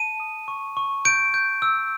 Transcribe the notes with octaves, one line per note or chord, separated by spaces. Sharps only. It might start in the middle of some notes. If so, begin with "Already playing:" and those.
Already playing: A5 D#7
D#6
C#6
C#6
G6 D7
G6
E6